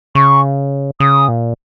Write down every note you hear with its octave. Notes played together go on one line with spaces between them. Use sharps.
C#3 C#6
C#3 D#6
A#2